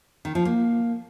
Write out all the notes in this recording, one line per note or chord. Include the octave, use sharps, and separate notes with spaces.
D#3
F3
A#3